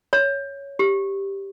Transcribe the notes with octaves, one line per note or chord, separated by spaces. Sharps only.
C#5
G4